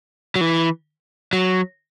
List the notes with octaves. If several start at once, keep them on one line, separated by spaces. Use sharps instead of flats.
F#3
E3
F#3